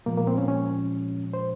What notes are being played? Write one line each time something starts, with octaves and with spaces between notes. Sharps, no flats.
A#2 F3 G#3 A#3
A#3
C4
C#4
C#4
C5